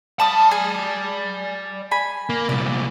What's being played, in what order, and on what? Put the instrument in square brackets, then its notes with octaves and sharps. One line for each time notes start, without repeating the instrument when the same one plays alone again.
[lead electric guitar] D5 B5 [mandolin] A5 D#6
[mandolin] G#4 G#5
G#5 B5
[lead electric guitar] A#3
[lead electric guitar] C2 A#2 [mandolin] D5